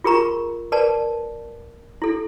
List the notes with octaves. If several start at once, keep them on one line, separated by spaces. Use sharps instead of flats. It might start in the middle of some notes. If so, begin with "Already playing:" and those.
F4 G#4 A#4 A#5 C#6
A#4 B4 D5 A5
E4 A4